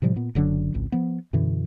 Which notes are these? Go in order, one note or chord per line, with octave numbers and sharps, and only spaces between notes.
A2 C3 F3 G3
A#2 B3
F#1 D3 F#3 D4
G#1 C#2
F3 B3
F#2 B2 D3 E3